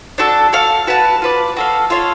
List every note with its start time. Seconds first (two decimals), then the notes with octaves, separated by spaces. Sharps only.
0.18 D4 F#4 A4
0.53 F#4 A4 F5
0.87 F#4 B4 F#5 A5
1.22 F4 B4 D5
1.57 F#4 A4 F5
1.90 F4 A4 C#5 F5